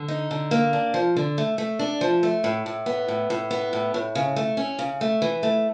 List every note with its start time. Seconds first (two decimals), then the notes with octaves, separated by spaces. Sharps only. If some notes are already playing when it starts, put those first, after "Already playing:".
Already playing: D3
0.08 D#4
0.31 D3
0.51 A#3
0.73 D4
0.94 F3
1.16 D3
1.38 A3
1.58 A3
1.79 D4
2.01 F3
2.23 A3
2.44 A2
2.66 A2
2.86 B3
3.08 A2
3.30 A2
3.51 B3
3.73 A2
3.94 A2
4.15 C#3
4.36 A3
4.57 C#4
4.79 C#3
5.01 A3
5.22 E3
5.43 A3